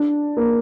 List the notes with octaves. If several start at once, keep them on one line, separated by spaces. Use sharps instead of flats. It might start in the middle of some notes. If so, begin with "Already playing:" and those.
Already playing: D4
A#3